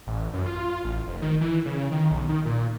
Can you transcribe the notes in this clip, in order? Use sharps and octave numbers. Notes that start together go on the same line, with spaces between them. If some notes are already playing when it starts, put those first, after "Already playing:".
A1
F#2
F4
A1
F1
D#3
E3
C#3
D#3
B1
D#3
A#2